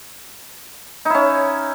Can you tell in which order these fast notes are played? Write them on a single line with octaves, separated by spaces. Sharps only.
D#4 E4 C#4